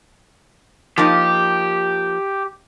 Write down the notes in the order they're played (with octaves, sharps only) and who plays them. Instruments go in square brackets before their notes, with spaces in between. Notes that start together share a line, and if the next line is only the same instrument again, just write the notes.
[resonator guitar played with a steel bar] F3 A#3 D#4 [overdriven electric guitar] G4